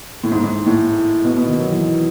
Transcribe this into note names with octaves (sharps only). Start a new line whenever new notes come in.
A2
G#2
G#2
A2
B2
B2
D#3
F#3
E3
E3